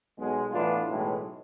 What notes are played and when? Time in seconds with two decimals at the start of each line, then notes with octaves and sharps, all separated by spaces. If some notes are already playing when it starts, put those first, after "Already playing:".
0.17 B1 B2 G#3
0.52 A2 E3 B3 D4 F4
0.88 B1 A2 E3 G#3